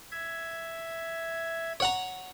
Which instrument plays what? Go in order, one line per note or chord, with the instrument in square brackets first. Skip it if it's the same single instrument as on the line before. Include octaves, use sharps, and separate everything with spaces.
[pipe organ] E5 G#6
[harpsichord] C#5 F#5 A#5